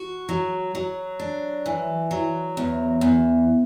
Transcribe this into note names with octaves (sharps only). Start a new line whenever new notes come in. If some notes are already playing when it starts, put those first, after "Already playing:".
Already playing: F#4
F#3
F#3
D4
E3
F#3
E2
E2